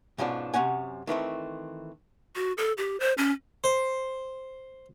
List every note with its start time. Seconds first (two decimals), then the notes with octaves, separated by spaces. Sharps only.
0.18 G#2 B2 F3 C#4 D4
0.54 F#2 C3 C#4 F#5 G#5
1.07 D#3 E3 A3 C4
2.35 F#4
2.58 A4
2.78 G4
3.00 C5
3.18 C#4
3.64 C5